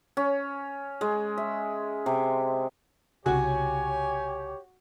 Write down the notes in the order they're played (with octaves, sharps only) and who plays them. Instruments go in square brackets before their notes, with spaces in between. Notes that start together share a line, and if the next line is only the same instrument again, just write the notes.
[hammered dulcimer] C#4
G#3
E5
C3
[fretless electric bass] C2 C#3 [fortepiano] F#4 [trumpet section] G4 C#5 [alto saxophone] G#5